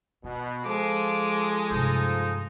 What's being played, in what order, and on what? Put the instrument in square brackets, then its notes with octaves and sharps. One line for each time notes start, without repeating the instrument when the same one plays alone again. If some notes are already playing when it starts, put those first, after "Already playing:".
[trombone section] B2 [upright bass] F4
[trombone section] F3 A4 [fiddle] G#3 [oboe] D6
[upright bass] G2 C3 [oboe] D#4